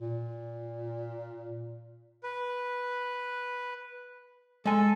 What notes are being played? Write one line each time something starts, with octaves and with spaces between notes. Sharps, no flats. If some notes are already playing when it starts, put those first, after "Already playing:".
A#2
B4
G#3 A4 G#5